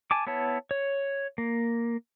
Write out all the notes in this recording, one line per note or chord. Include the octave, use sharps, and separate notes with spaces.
G#5 A5 D6
B3 E4 C#5 A5
C#5
A#3